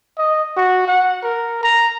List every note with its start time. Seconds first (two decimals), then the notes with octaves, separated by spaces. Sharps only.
0.18 D#5
0.57 F#4
0.88 F#5
1.23 A#4
1.63 A#5